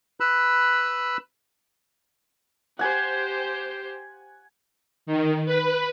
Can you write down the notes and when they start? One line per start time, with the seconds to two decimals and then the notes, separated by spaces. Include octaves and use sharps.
0.20 B4 B5 E6 F#6
2.79 G4 C5 F#5 G#5
5.06 D#3
5.46 B4